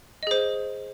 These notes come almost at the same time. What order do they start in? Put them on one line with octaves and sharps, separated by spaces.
D#5 G#4 C5